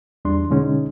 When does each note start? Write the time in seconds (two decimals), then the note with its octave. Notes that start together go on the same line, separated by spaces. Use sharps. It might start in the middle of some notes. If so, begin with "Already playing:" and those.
0.25 E2 G3 D4 C6
0.50 B2 D3 G#3 C#4 D#4